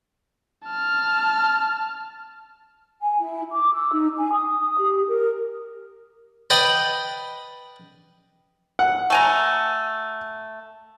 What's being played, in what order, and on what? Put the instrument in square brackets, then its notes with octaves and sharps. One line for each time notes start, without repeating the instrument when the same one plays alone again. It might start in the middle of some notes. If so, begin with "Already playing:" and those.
[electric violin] A5 F6
[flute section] G#5
E4
D6
E6
D#4
G#5
D#6
G4
A#4
[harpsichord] B4 D5 D#5 F#5 G5 B5
[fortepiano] F#5
[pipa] A3 G#5 A#5